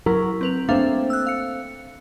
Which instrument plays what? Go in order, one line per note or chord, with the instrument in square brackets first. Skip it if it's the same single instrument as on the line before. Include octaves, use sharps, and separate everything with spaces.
[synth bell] F#3 E4 [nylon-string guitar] A#4
[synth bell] C4 B4 F7
[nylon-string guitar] A3 C4 [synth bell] A#3 D4 F5
[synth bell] E6 F#6
F5 C#7